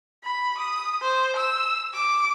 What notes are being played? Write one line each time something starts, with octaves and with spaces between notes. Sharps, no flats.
B5
D#6
C5
E6
D6